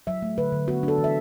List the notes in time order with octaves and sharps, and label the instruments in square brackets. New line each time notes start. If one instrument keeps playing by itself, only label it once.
[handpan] F#3 E5
A3
D3 B4
D3
B3 F#4
D4
A4
E3
E5